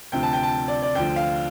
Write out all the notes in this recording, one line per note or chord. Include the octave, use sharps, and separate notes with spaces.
D2 C3 F3 G5
A5
G5
A5
D5
D5
D2 D3 F3 G5
F5